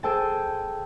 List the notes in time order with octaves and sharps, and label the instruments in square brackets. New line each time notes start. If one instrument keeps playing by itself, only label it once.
[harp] G#4 A4 C5 G5 A5